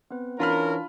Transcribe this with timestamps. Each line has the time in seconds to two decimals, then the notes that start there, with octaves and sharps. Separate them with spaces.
0.11 B3 C4 B4
0.40 E3 C#4 D4 F4 A#4 B5 F6